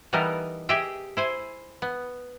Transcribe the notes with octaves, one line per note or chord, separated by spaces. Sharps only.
E3 G3 B3 D#4 A4 A#4
G4 G#4 D#5 E5 G5
E4 C5 G#5
B3